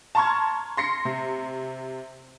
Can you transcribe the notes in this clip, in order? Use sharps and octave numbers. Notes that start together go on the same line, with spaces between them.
A5 A#5 C6 C#6 F6 G#6
C6 A#6 C7 C#7
C3